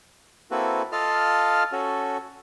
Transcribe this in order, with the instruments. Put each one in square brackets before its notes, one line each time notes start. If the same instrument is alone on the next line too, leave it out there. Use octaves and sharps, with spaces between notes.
[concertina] A#3 C4 E4 F#4 A4 B4
F4 A4 D#5 F5 A5 F6
C#4 F#4 A4